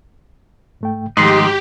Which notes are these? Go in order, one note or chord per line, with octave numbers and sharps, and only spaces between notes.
G#2 A3 G5
G#2 D#3 F3 A3 G4 D#5 C6